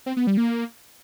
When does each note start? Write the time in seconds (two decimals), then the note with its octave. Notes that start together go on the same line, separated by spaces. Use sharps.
0.06 C4
0.17 B3
0.27 G3
0.37 A#3